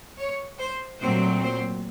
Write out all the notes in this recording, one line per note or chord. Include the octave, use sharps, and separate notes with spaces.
C#5
C5
A#2 F#3 A3 C4 C5
C5